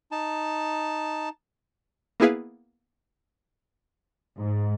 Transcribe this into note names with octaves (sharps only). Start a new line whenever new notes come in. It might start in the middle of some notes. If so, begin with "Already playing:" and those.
D#4 A5
A#3 B3 E4 G#4 B4 F5
G#2